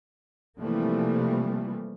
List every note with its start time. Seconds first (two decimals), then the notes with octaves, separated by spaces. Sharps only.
0.60 C3 E3 F3 G3 A3 A#3